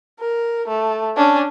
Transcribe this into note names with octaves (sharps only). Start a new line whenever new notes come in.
A#4
A3
C#4 D4